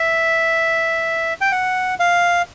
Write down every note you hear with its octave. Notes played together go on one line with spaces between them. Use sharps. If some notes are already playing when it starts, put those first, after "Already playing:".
Already playing: E5
G5
F#5
F5